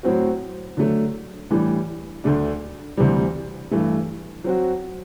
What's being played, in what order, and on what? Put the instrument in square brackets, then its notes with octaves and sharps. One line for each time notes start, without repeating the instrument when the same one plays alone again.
[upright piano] A2 F#3 C4 F#4
D3 F#3 A3
A2 E3 G3 D4
D2 D3 A3 D4
D2 C3 E3 G3
G2 E3 A3
F#3 C4 F#4